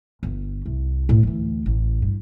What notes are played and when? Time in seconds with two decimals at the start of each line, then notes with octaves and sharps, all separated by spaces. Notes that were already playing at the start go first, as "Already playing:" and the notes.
0.23 G1
0.66 C2
1.09 A2 C4
1.23 D2 E3
1.66 A1
2.02 G2